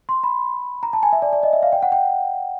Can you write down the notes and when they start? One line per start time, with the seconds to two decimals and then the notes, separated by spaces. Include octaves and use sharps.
0.09 C6
0.23 B5
0.83 A#5
0.93 A5
1.03 G#5
1.13 E5
1.22 D5
1.33 D5
1.43 D#5
1.53 E5
1.63 F5
1.73 G5
1.82 F#5
1.92 G5